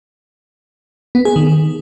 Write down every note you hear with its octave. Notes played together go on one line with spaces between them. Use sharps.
B3
G#4
D#3